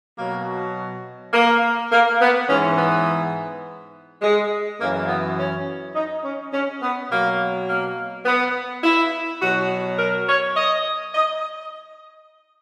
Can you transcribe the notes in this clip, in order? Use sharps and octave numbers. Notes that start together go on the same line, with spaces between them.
B2 F#3 A#3
A#3
A#3
B3
G#2 E3 C#4
B3
G#3
F#2 E3 A#3
B3
C#4
D#4
C#4
C#4
B3
B2 F#3 A#3
A#3
B3
E4
B2 F#3 F#4
A#4
C#5
D#5
D#5